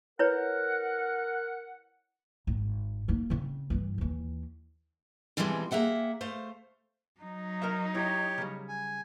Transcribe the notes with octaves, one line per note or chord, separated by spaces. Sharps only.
E4 A#4 B4 C#5 F#5
G#1
A#3 D#4
C#3 C4
G2 E3
D#2 E3
B2 E3 F3 G3 G#3 C4
A#3 G#4 E5 F#5 G5
A3 C5 F5
F#3 D#4
A#4 D#5 E5
E4 G4 C#5
C#3 G3
G#5